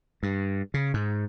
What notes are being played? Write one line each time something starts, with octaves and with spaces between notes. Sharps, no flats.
G2
C#3
G#2